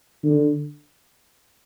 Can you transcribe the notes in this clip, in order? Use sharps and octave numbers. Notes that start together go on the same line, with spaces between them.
D3